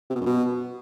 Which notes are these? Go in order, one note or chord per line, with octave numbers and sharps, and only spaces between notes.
C3
B2
F#2
B2